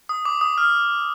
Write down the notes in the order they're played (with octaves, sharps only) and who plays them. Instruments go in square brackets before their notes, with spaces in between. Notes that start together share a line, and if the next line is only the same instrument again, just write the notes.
[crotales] D#6
D6
D#6
F6